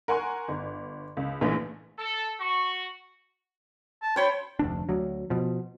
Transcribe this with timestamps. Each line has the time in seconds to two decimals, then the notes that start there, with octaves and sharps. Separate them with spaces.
0.08 A#4 F#5 G#5 C6 C#6 F#6
0.48 G1
1.17 C#2
1.41 A#1 E3 A3
1.98 A4
2.39 F#4 C#6
4.02 A5
4.16 C5 C#5 G5 B5
4.59 F1 D2 D4
4.89 D2 F#3
5.30 B2 F3